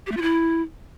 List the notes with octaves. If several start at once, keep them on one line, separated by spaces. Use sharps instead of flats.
G4
A3
F4
E4